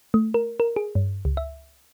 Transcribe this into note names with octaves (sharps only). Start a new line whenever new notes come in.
A3
A#4
A#4
G#4
G2
C#2
E5